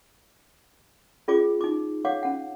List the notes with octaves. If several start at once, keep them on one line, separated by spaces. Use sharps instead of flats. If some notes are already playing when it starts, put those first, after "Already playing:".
C#4 F4 G#4 D5 D6
D#4 D6
C#5 F5 F#5 D6
C#4 F#5